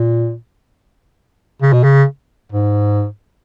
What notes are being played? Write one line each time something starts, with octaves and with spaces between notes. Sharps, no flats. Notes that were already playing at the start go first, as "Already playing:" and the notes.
Already playing: A#2
C#3
B2
C#3
G#2